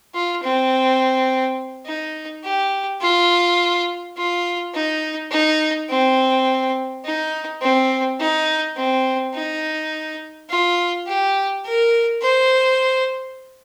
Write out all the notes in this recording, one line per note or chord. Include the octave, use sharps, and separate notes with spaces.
F4
C4
D#4
G4
F4
F4
D#4
D#4
C4
D#4
C4
D#4
C4
D#4
F4
G4
A#4
C5